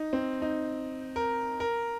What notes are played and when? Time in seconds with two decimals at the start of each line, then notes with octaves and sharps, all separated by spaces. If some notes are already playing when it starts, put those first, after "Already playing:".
Already playing: D#4
0.13 C4
0.42 D#4
1.16 A#4
1.60 A#4